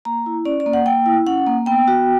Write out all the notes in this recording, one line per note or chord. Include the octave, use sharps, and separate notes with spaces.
A#3 A#5
E4
C#4 D5
D5
A#3
F#5
A#3 G5
E4
C#4 F#5
A#3
B3 G5
F#4